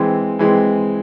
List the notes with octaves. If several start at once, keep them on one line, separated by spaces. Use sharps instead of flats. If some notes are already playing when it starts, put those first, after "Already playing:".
Already playing: E3 G#3 C4
E3 G#3 C4